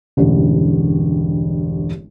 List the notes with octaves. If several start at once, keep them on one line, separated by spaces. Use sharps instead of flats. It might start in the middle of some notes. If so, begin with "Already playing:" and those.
E1 A1 G2 D3